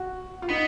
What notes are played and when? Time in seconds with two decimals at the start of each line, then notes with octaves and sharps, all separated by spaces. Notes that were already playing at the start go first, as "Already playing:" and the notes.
Already playing: F#4
0.42 F4
0.49 B3 D#4